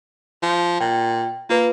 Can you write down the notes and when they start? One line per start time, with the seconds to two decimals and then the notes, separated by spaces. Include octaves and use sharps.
0.43 F3
0.81 A#2 G5
1.50 A#3 F4 B4